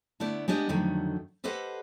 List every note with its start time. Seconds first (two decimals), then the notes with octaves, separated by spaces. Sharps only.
0.20 D3 A3 B3 E4 D5
0.48 G#3 B3 D4 G4 D#5
0.69 F2 D3 D#3 F#3 A3
1.44 G4 A4 B4 C5 D#5 F#5